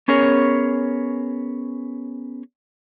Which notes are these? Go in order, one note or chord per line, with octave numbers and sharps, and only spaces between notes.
B3 C#4 G#4 A#4 C#5